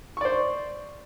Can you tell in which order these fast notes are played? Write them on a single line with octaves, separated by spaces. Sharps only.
C#6 D5 C5